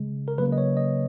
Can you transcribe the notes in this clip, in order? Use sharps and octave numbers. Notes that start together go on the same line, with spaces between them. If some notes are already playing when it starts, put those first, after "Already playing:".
Already playing: C#3 G#3
A#4
C#3 F#3 A#3 B4
D#5
C#5
D#5